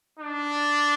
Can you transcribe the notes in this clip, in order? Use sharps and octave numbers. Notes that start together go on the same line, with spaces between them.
D4